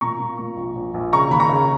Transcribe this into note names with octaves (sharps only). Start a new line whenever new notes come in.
A#2 A#5 C#6
A#2
A#2
A#1
A#1
A#1
C#3 A#5 C#6
D#2 B5
A#5 C#6
C#3